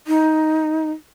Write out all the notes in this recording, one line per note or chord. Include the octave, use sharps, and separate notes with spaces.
D#4